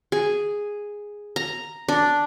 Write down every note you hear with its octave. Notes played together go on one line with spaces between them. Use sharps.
G#4
A#5
D4